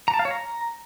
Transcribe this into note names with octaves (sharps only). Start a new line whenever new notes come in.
A#5
A5
F5
C#5
A#5